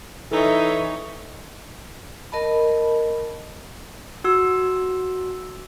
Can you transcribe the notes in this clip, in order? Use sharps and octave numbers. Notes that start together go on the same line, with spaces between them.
E3 D#4 A4 C#5 E5
A#4 D#5 A5 B5
F#4 E6